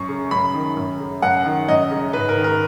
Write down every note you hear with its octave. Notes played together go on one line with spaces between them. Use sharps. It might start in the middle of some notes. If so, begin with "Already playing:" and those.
Already playing: F#2 C#6
C#3
F#2 B5
D#3
F#2
C#3
F#2 F#5
D#3
F#2 D#5
C#3
G#2 B4
A#4
D#3
A#4